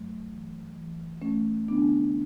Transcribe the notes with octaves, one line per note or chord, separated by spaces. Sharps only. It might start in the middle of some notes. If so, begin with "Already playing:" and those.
Already playing: G2 F#3 A3
E3
E3
E2 A3 C#4
D3 B3 D4